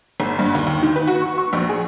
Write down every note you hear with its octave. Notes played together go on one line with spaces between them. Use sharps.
G#1
G2
D#2
D#2
D#3
B4
F#4
C#6
C#6
A#1
G#4